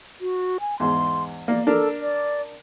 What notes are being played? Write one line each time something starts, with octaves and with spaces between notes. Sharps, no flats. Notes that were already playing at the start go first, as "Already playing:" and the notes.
F#4
G#5
E2 G#2 C6
A#3 D5
D4 A4 A#4
D5